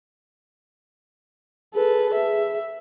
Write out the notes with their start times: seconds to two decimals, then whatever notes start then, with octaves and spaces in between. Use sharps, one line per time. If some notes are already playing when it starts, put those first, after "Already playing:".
1.74 G#4 A4 B4
2.14 E5